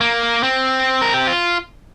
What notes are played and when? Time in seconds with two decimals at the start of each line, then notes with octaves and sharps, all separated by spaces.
0.01 A#3
0.43 C4
1.01 A#4
1.14 G4
1.27 F4